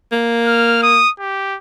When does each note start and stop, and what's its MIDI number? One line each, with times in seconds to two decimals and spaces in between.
0.12 1.01 58
0.46 0.81 89
0.83 1.10 87
1.19 1.58 67